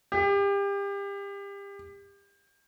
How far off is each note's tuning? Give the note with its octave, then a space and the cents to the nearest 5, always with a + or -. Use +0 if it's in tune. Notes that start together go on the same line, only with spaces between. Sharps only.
G4 +30